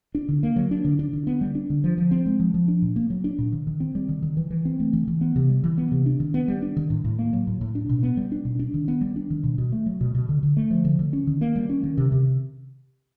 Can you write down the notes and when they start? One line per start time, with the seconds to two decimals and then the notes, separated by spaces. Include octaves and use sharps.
0.15 D4
0.29 D3
0.43 A#3
0.56 F#3
0.71 D4
0.85 D3
0.99 D4
1.13 D3
1.27 B3
1.41 G3
1.55 D4
1.70 D3
1.84 F3
1.98 F3
2.11 C4
2.26 G#3
2.40 F3
2.54 F3
2.68 D4
2.82 A#2
2.96 A#3
3.10 F#3
3.24 D4
3.39 A#2
3.53 D#3
3.67 D#3
3.80 C4
3.95 G3
4.09 D#3
4.22 D#3
4.37 E3
4.51 E3
4.65 C4
4.80 A3
4.93 E3
5.08 E3
5.21 B3
5.36 C3
5.50 G3
5.64 E3
5.78 B3
5.92 C3
6.06 D4
6.20 D#3
6.34 B3
6.48 G3
6.62 D4
6.77 D#3
6.90 A2
7.05 A2
7.19 A#3
7.33 F#3
7.47 A2
7.61 A2
7.75 D4
7.89 B2
8.03 B3
8.17 G3
8.32 D4
8.45 B2
8.59 D4
8.74 D#3
8.88 B3
9.01 G3
9.16 D4
9.30 D#3
9.44 B2
9.58 B2
9.72 A3
9.86 F#3
10.01 B2
10.15 B2
10.29 D3
10.43 D3
10.57 A3
10.71 F3
10.85 D3
10.99 D3
11.13 C#4
11.27 D#3
11.41 A#3
11.56 G3
11.70 C#4
11.84 D#3
11.98 C3
12.12 C3